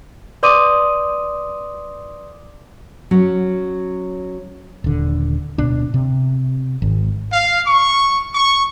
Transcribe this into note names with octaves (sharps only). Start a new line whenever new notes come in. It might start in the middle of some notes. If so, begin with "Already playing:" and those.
B4 D5 C6 D6 D#6 D#7
F#3 C#4
D#1 D3
D1 B2 D4
C3
G#1
F5
C#6
C#6